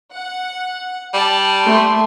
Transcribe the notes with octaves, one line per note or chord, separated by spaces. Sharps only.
F#5
G3 A5
A3 C6